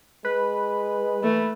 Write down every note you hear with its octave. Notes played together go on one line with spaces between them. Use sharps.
G#3 B4
E3 A3